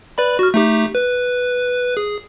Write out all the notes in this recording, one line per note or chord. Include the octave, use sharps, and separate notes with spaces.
B4 D5 B5
F#4 F6
A3 D#4 G4
B4
G#4